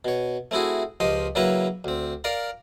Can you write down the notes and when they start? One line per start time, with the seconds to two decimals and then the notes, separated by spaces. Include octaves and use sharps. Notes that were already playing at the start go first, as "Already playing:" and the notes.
0.05 B2 C#5
0.51 A3 C4 E4 F#4 G#4
1.00 C#2 F3 G4 D#5 C6
1.35 C#3 F#3 A#3 E4 B4 A#5
1.84 D2 C4
2.24 A#4 D5 F5 A#5